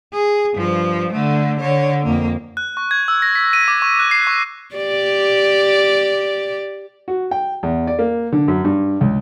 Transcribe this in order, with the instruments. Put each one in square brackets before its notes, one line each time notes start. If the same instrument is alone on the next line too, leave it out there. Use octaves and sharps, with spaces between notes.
[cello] G#4
G2 F3
D3 A3
D3 C#5
F2 A#3
[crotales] F#6
C#6
G#6
E6
A#6
B6
D#7
D6
C#6
F#6
C7
C#6
[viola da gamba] G4 D5
[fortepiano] F#4
G5
E2
D5
A#3
D3
F#2
G2
C#2